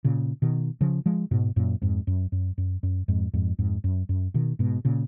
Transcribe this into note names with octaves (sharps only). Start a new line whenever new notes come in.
A#2 C#3
B2 D#3
C#3 F3
F3 G#3
G#2 B2
F#2 A#2
F2 G#2
F#2
F#2
F#2
F#2
F2 G#2
F2 G#2
F2 G#2
F#2
F#2
B2 D#3
G#2 B2
A#2 C#3